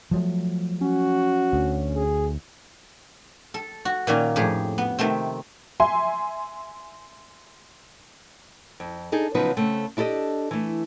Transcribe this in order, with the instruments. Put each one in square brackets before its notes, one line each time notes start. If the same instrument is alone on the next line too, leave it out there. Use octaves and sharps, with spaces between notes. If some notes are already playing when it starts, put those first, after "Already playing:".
[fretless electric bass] F3 F#3 A3
[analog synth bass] C#4 [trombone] F#4
[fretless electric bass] D2
[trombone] G#4
[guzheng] A4
F#4
A#2 D#3 A#3 C#4
F2 A2 G4 G#4
B3
C3 D#3 A3 C4
[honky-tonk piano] E5 G#5 C6
[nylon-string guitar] F2
D4 D#4 G#4 A4
C#3 F3 F#3 B3 D#4 B4
C#3 A3 C4
D4 E4 G4 A4 D#5
E3 A3